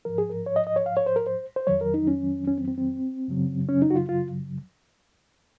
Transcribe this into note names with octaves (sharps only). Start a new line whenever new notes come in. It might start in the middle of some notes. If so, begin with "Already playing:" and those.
G#2 F3 A#4
G#4
A#4
C#5
D#5
D#5
C#5
F5
C#5
C5
A#4
C5
C5
F2 D#3 F#3 C#5
A#4
D#4
C#4
C#4
C4
C4
C4
F#2 C#3 F#3
C#4
D#4
F#4
F4
F4